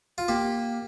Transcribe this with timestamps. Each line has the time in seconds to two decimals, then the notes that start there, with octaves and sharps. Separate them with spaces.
0.18 F4
0.28 A#3 G4